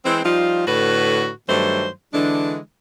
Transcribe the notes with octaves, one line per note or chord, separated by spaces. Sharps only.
E3 G#3 C4
F3 G3 D#4 F4
A2 D3 F#4 B4
G2 D#3 F#3 A3 C5
D3 E3 G#3 D4